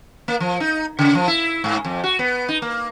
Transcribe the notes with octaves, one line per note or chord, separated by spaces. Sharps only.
A#3
F3
D#4
C#3
F3
E4
G#2
F2
F#4
B3
D#4
A#3